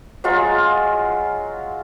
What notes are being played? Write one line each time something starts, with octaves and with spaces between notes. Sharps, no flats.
F#3 G#3 F4